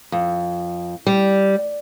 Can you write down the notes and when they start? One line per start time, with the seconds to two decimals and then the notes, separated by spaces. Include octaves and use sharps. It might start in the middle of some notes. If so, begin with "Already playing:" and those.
0.12 F2
1.07 G3